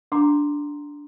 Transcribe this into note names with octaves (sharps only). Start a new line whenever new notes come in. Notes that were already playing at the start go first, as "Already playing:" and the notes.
D4 F#5 A#5 C6 D6